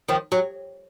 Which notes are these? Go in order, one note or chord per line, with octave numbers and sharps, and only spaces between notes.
D#3 F3
F#3